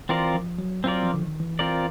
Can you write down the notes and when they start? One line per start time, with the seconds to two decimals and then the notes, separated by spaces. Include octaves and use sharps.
0.09 E3 C4 F4 A#4 D5
0.35 F3
0.59 F#3
0.84 F#3 C4 F4 A#4 D5
1.03 F3
1.14 D3
1.22 D#3
1.40 E3
1.59 C4 F4 A#4 D5